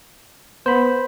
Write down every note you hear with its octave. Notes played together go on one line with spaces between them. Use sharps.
B3 C5 B5